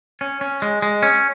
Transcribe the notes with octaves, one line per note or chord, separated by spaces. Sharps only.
C#4
C#4
G#3
G#3
C#4